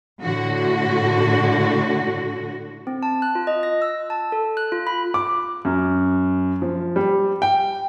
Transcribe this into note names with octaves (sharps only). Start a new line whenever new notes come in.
A2 D3 F#4
C4
A5
F#6
F4
D#5
A#6
E6
A5
A4
F#6
F4
B5
D6
F#2
F3
G3
G5